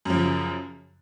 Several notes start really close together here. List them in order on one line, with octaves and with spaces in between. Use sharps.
F#2 F3 C#3